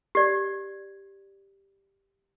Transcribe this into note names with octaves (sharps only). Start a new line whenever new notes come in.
G4 D5